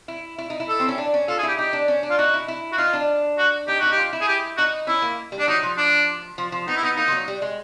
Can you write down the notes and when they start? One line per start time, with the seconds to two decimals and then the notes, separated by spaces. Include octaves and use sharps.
0.08 E4
0.38 E4
0.50 D#4
0.60 E4
0.69 A4
0.80 C4
0.88 C#4
0.98 D4
1.14 C#4
1.28 F4 A4
1.38 G#4
1.43 E4 G4
1.58 D#4 G4
1.73 D4
1.88 C#4
2.03 D4
2.10 F4
2.18 D#4 F#4
2.34 E4
2.48 E4
2.73 F#4
2.78 D#4 F4
2.93 D4
3.38 F#4
3.68 D#4 G4
3.80 D#4 F#4
3.92 G4
3.97 F4
4.13 E4
4.21 G#4
4.28 G4
4.57 D#4 F#4
4.87 C#4 E4
5.02 A#3
5.32 G3
5.39 D4
5.48 F#3 D#4
5.63 F3
5.78 D4
6.38 F3
6.52 F3
6.67 B3 D#4
6.76 E4
6.83 B3 D#4
6.97 A#3 D#4
7.08 F3
7.12 F#3
7.28 G3
7.42 G#3